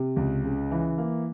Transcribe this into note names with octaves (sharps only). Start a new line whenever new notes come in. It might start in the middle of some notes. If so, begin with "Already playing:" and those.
Already playing: C3
C#2
C#3
E3
A#3